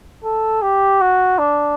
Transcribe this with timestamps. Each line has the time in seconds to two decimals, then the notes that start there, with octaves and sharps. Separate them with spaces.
0.24 A4
0.62 G4
1.01 F#4
1.39 D4